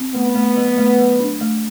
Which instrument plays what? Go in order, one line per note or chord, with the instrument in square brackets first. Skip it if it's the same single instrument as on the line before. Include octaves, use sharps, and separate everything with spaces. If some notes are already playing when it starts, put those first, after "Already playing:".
Already playing: [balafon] C4
[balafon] A3 [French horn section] B3
[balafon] A3
F#3
A3
F#3
D4
A3